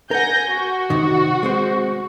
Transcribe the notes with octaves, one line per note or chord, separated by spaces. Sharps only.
A#4 F#5 G#5 G6 A#6
F#4
C3 D#3
G#3 C4 C5